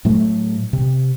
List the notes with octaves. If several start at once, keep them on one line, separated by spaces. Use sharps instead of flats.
A2 F#3 A3
C3